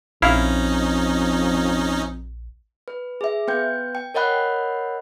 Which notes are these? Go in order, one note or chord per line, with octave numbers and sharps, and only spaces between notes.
A#1 F2 C#4 D#4 E4 F5
B4
G#4 E5
B3 B4 G5 G6
G5
A#4 C#5 D#5 F#5 B5 F#6